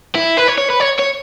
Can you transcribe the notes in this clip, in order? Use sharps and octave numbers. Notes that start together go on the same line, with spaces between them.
E4
B4
C#5
C#5
B4
C#5
C#5